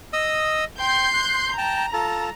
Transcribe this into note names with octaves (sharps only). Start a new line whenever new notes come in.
D#5 D#6 E6
G5 C6 G6
F#6
G5 A5 A#5
F4 A4 A5